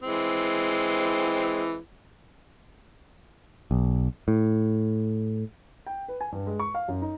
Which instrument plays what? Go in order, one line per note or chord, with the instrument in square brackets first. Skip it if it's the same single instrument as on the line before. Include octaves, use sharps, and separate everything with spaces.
[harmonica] E3 G#3 C4
[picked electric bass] B1
A2
[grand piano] G5
B4
G#5
G2
G#3
C#6
F5
F#2
D#4